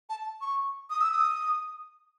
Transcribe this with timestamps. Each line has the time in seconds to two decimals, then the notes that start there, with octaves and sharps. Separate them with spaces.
0.09 A5
0.41 C#6
0.90 D#6
1.01 E6
1.13 D#6